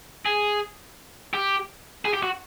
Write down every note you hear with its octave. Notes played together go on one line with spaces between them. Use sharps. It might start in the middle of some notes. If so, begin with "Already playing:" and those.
G#4
G4
G#4
G4
F#4